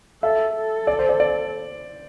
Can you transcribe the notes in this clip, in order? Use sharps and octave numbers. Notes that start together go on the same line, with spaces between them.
A4 E5
A4
D5
C5
D5
D5